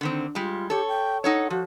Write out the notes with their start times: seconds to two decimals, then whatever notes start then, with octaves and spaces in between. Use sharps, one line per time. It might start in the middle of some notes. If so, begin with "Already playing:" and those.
0.01 D3 D#3 C4
0.35 G3 G#3 F4
0.70 G4 A4 C#5
0.88 G5
1.24 D#4 A4 C#5 F#5
1.50 F3 F#4